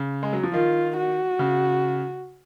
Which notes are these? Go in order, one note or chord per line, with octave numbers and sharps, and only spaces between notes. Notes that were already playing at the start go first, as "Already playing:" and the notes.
Already playing: C#3
G#3
F#3
F3
D#3 F4
F#4
C#3